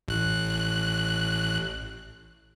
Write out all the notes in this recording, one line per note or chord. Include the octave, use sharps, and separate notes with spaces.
A1 F#6